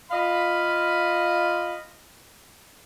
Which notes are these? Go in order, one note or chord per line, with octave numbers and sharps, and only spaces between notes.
F4 D#5 F5 B5